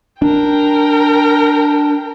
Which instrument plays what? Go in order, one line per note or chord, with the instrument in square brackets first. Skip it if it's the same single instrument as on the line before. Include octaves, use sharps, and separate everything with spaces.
[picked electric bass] D4 [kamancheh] A#4 G5